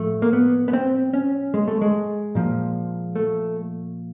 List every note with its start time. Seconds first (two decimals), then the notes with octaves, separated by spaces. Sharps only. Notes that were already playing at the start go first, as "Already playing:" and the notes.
Already playing: A2 F3 A3
0.22 A#3
0.33 B3
0.68 B3
0.73 C4
1.13 C#4
1.54 G#3
1.68 A3
1.81 G#3
2.35 A#2 F3
3.16 A3